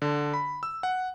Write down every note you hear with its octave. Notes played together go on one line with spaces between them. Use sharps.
D3
B5
E6
F#5